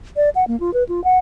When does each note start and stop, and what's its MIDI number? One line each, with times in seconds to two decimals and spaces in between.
0.16 0.29 74
0.35 0.44 78
0.48 0.59 58
0.60 0.73 65
0.74 0.84 71
0.89 1.03 65
1.04 1.19 78